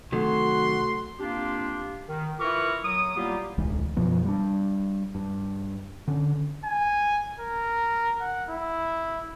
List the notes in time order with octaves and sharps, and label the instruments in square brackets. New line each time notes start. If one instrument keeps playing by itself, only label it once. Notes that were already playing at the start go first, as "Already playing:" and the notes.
[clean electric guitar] C3 D#3 F#3 [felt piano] A3 [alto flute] F#4 [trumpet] C6
[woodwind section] A#3 C4 D4 F4 G4
D#3
E4 F4 A#4 B4 C#6 D6
F#3 D#6
G3 A#3 B3 E4 F4 G4
[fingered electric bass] D1 B1 E3 G#3
F#2 B2 F3 B3
G3 D4
G2
D3 C#4
[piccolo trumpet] G#5
A#4
F#5
E4